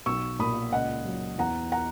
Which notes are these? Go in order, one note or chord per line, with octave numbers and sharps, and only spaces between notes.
B1 C#6 E6
A#2 B5 D#6
C#2 D#5 F#5
F#3
E2 F#5 A#5
F#5 A#5